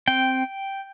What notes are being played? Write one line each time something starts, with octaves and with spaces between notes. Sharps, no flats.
C4 G5